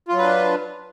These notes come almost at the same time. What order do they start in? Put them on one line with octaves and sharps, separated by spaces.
F4 F#3 B4 D4